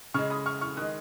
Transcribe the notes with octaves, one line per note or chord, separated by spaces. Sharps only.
C#3 G#3 C#6 F6
B5 D#6
C#6 F6
C#6 F6
D#3 G#3 D#6 F#6